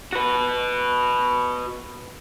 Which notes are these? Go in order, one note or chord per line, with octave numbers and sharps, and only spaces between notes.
F#4 B4